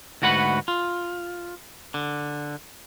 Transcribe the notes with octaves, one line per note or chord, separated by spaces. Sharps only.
D2 G#2 F#4 B4 F#5 B5
F4
D3